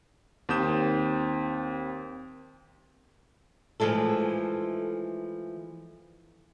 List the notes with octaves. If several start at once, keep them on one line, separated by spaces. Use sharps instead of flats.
D#2 C4 D#6 G6 E7
E3 F3 G#3 A3 A4